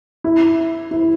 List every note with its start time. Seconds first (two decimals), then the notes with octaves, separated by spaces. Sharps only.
0.24 E4
0.91 E4